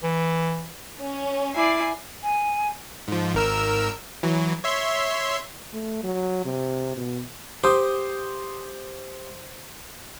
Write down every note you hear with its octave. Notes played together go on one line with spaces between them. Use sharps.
E3
C#4
E4 D5 G#5 C7
G#5
G#2 F3
G#1 A#4 E6
E3 F#3
C#5 E5 C6
A3
F#3
C3
B2
G4 C5 D#6